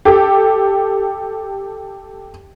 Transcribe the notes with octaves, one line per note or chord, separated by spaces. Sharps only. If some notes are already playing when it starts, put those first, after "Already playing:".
G4 A4